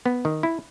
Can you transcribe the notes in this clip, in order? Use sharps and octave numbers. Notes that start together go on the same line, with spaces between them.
B3
D#3
E4